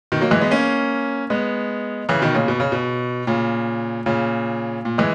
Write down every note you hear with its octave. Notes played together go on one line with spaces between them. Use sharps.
B2 D#3
F#3 A#3
E3 G#3
G#3 B3
A#3 C#4
G#3 B3
C#3 E3
B2 D#3
A#2 C#3
B2
C#3
B2
A#2 C#3
A#2 C#3
A#2
E3 G#3